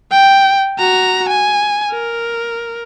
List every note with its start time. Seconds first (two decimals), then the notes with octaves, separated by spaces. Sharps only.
0.11 G5
0.78 F#4 A#5
1.28 G#5
1.91 A#4